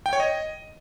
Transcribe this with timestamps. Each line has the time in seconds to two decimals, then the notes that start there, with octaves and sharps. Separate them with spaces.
0.06 G5
0.13 C#5
0.20 D#5